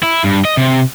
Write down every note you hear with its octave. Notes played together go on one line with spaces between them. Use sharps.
E4
G2
D#5
C3